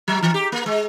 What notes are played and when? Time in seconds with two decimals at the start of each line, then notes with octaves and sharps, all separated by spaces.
0.08 F#3
0.23 E3
0.34 G4
0.52 A#3
0.66 G#3